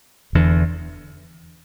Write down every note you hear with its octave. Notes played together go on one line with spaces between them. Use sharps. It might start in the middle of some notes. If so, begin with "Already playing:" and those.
E1 E2 D3